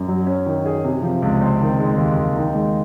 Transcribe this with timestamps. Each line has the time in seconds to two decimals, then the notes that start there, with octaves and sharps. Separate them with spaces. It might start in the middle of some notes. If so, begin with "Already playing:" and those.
Already playing: F#2
0.08 F#3
0.27 C#4
0.46 D#3
0.66 G#4
0.85 C3
1.02 F3
1.22 C#2
1.41 C4
1.61 D#3
1.79 G#3
1.98 D#2
2.18 D#2
2.36 D#3
2.55 G#3